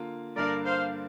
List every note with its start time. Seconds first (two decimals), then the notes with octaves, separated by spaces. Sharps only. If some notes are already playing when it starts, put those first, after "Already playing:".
Already playing: D3 A#3 F4
0.36 G2 D3 A#3 D4 A#4 D5
0.65 C5 F5